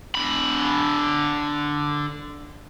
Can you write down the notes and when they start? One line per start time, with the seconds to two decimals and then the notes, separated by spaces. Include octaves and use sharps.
0.15 D3 B5